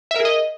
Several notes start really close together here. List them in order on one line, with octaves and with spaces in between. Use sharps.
E5 A#4 G#4 D#5